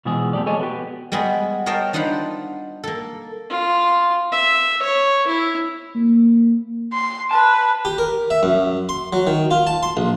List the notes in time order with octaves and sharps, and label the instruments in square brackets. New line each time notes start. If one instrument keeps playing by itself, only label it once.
[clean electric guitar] B2 E3 F3 G#3 F#4 G#4
F2 A3 G4 A4 D5
G#4 A4 C#5 D#5 G#5
B3 F#4 G4
[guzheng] G3 G#3 B3 F#4 G#4
A#4 C#5 D#5 F5 G5 A5
D4 D#4 F4 C5 F#5 B5
A#3 A4
[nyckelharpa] F4
E5
C#5
E4
[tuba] A#3
[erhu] C6
[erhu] B4 [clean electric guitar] A5
[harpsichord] G4
A#4
E5
F#2
C6
F#3
D#3
F4
A5
C6
A#1